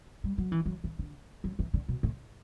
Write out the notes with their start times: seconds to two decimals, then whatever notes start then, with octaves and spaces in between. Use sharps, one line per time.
0.24 G3
0.38 F#3
0.52 E3
0.65 F#3
0.84 E3
0.99 D3
1.44 F#3
1.59 E3
1.74 D3
1.88 B2
2.03 A2